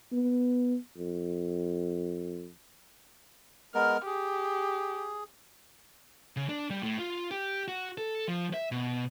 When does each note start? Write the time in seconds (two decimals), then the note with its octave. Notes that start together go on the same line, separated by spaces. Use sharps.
0.12 B3
0.97 F2
3.75 G#3 B3 A#4 F6
4.06 G4 G#4
6.36 C#3
6.49 D4
6.70 G3
6.83 A2
6.99 F4
7.31 G4
7.68 F#4
7.98 A4
8.28 F3
8.54 E5
8.72 B2